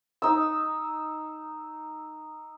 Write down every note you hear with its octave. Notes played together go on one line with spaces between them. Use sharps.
D#4 E6